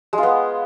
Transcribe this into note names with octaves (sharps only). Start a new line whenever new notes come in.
G#3
F4
B3